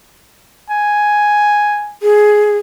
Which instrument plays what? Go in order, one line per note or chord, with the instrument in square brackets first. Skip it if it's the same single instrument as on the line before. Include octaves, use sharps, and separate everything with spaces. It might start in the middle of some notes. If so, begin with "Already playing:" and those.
[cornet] G#5
[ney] G#4